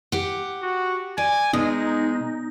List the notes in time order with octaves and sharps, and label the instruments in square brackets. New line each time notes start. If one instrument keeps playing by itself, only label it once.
[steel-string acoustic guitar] G4 F#5
[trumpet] F#4
[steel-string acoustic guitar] D5 [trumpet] G#5
[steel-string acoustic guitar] B2 [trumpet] G#3 [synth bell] D#4